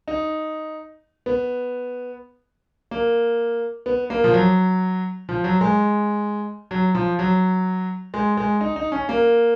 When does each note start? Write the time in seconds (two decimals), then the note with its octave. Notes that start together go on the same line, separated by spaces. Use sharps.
0.08 D#4
1.26 B3
2.91 A#3
3.86 B3
4.10 A#3
4.24 F3
4.34 F#3
5.29 F3
5.44 F#3
5.61 G#3
6.71 F#3
6.95 F3
7.19 F#3
8.14 G#3
8.37 G#3
8.61 D#4
8.76 D#4
8.92 C#4
9.09 A#3